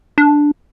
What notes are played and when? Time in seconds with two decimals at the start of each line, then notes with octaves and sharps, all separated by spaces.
0.18 D4